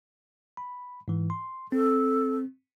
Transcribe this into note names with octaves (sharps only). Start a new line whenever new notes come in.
B5
G#2 E3
C6
C4 A4